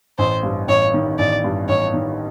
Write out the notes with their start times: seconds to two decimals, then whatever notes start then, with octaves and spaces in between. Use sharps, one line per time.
0.18 A1 C5
0.43 G2
0.68 A1 C#5
0.94 D#3
1.19 A1 D5
1.44 G2
1.69 A1 C#5
1.94 D#3